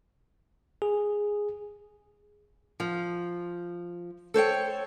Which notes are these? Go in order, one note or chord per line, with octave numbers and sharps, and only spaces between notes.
G#4
F3
A4 C5 C#5 G5